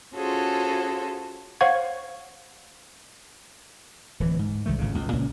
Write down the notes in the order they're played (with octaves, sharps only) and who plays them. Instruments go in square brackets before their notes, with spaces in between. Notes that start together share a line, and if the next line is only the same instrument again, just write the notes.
[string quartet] C#4 F4 F#4 G#4 A4 C5
[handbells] C5 C#5 F5 F#5 C#6 G#6
[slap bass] D1 E3
G#2
C2 D#3 A3
G#1 C#2 A2 C#3
C#2 B2
C#2 A#2 C#4